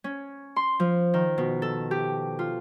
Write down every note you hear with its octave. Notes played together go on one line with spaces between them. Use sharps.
C#4
C6
F3
D#3
B2
A4
G4
F4